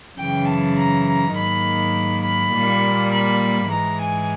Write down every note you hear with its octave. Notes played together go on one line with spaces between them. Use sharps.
F#2 C#3 E3 G5
A5
A#5
A#5
G#2 D#3 F#3 A#3 B5
B5
A#2 G3 A#3
B5
G#2 E3 G#3 A#5
G#5